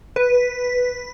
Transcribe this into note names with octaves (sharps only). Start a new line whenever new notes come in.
B4